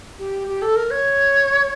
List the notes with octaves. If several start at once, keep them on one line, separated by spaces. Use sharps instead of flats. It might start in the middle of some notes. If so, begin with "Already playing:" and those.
G4
G4
A4
A#4
C#5